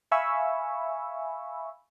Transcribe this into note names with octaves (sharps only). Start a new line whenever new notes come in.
E5 F5 G#5 B5 C#6 E6